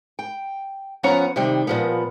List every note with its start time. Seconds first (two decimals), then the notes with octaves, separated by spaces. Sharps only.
0.19 G5
1.03 F3 B3 C#4 C#5 F#5 A#5
1.36 C3 D#3 G3
1.67 A#2 F3 B3